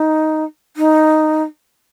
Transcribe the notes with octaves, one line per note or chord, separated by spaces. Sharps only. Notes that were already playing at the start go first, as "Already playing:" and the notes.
Already playing: D#4
D#4